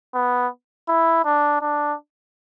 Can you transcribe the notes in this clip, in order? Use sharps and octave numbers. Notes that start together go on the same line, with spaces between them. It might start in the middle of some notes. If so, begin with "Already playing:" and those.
B3
E4
D4
D4